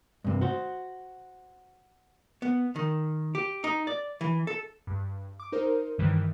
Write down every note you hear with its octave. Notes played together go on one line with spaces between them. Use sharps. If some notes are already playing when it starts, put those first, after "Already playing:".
G2 C3
F#4 C5
B3
D#3
G4
D#4
D5
E3
A4
G2
D6
D#4 A#4 C5
G2 D#3 E3 G3